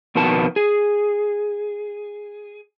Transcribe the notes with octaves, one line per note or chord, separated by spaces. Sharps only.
F2 B2 D#3 B3 A5
G#4